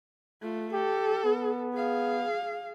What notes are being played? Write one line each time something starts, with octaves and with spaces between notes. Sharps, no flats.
A3 F4
G4 A4
B3
G#4 F5